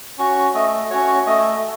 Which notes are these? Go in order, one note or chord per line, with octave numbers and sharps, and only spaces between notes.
C#4 F#4
A3 D#5
C#4 F#4 C#5
A3 D#5